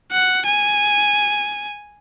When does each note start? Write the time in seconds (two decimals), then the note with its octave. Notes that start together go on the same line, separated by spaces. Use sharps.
0.12 F#5
0.45 G#5